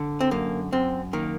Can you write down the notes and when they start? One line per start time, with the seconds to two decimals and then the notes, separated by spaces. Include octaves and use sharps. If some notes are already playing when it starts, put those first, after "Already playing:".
Already playing: D3
0.21 C4
0.31 F#2 A#3
0.72 F#2 C4
1.13 D#3 A#3